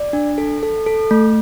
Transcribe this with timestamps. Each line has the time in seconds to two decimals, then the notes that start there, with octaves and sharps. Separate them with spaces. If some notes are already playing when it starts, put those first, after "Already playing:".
Already playing: D5
0.13 D4
0.38 A4
0.63 A4
0.86 A4
1.11 A3